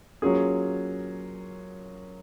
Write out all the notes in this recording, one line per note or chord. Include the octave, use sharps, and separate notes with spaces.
F#3 A#3 C#4 F4 G#4